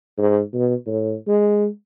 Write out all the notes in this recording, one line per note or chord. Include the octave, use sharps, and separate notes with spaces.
G#2
B2
A2
G#3